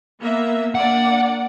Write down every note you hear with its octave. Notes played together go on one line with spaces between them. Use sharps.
A#3 B3 E5
A#3 D4 D5 F#5